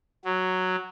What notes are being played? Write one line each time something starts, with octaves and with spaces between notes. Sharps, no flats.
F#3